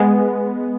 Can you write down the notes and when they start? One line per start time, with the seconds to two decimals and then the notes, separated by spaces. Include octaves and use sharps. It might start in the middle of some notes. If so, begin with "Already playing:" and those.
Already playing: G#3 B3